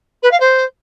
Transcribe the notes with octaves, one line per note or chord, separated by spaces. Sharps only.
B4
F5
C5